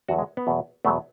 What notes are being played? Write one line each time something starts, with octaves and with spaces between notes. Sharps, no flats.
E2 D3 F#3 F#4
G#3
B3
E2 B2 F#3
E2 B2 F#3 A3